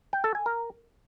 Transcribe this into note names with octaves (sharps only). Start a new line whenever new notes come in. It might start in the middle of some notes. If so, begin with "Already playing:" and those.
G5
A4
G#5
A#4